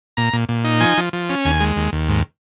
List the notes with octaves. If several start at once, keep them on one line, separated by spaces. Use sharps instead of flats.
A#2 A#5
A#2
A#2
D#4
F3 G#5
F3
F3
C#4
D#2 G#5
G#3
D#2
D#2
G#2